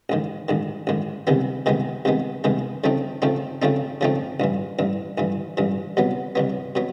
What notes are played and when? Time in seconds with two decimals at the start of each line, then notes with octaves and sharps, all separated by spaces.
0.09 A1 G#2 D#3
0.48 A1 G#2 D#3
0.87 A1 G#2 D#3
1.27 C2 C3 D#3 G#3 B3
1.66 C2 C3 D#3 G#3 B3
2.05 C2 C3 D#3 G#3 B3
2.44 C2 C3 D#3 G#3 B3
2.84 C#3 F3 A3 C4 D#4
3.22 C#3 F3 A3 C4 D#4
3.62 C#3 F3 A3 C4 D#4
4.01 C#3 F3 A3 C4 D#4
4.40 A1 G2 E3
4.79 A1 G2 E3
5.18 A1 G2 E3
5.57 A1 G2 E3
5.97 C2 B2 F#3 B3
6.35 C2 B2 F#3 B3
6.75 B2 F#3 B3